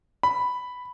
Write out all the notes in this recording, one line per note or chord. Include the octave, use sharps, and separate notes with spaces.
B5